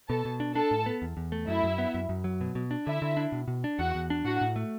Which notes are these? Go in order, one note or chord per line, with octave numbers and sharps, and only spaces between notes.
B2 A4 A5
B2
D4
D4 A4 A5
A2
B3
E2
E2
A3
F#2 E4 E5
F#2
B3
F#2
F#2
F#3
B2
B2
D4
D3 E4 E5
D3
D4
B2
B2
D4
E2 F#4 F#5
E2
D4
A2 F#4 F#5
A2
A3